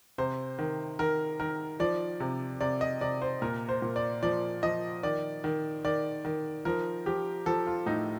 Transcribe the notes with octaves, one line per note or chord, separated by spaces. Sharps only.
C3 C5
D#3
D#3 A#4
D#3 A#4
F3 D5
C3
C3 D5
D#5
C3 D5
C5
A#2 A#4
C5
A#2
D5
F3 D5
F3 D#5
D#3 D5
D#3
D#3 D5
D#3
F3 A#4
F3 G4
F3 A4
F4
A2 D#4